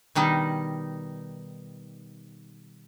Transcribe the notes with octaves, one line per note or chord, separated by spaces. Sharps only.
B2 D#3 G3 D#4